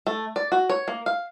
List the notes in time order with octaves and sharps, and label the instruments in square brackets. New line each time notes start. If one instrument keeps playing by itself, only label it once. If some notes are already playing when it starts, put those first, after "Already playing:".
[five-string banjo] A3
D5
F#4
C#5
A#3
F5